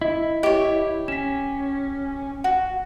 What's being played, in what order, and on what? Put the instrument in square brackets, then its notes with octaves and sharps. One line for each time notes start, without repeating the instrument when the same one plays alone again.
[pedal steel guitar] E4 [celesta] D#5
[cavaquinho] G4 C#5 [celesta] D#5
[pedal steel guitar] C#4 [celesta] B6 E7
[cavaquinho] F#4 [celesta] F#5